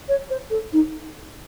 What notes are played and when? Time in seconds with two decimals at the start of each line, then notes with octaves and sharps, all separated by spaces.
0.08 C#5
0.30 C5
0.50 A4
0.73 D#4